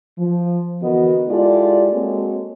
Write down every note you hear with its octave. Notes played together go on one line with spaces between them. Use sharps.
F3
D3 E3 B3 F#4 A#4 D#5
G#3 E4 F4 G4 A4 D5
G#3 A#3 C4 F#4 A4 C#5